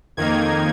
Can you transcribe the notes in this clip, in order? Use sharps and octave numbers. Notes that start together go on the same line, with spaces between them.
F2 D#3 A#3 D#4 G#6